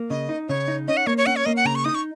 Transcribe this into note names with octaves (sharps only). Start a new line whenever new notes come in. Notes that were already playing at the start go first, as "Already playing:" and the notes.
Already playing: A#3
C#3 D#5
D#4
C#3 C#5
D#4
C#4 D#5
F#5
A#3 C#5
C#5
C#4 F#5
C#5
A#3 D#5
F#5
C#3 A#5
C#6
D#4 D#6
C#6